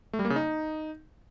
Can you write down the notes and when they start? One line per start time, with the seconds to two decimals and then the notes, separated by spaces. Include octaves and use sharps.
0.13 A3
0.19 G3
0.25 A#3
0.30 C#3
0.36 D#4